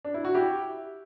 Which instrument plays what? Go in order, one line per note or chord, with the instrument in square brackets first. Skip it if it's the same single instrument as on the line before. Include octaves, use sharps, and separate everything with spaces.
[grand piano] D4
E4
F#4
E4 G4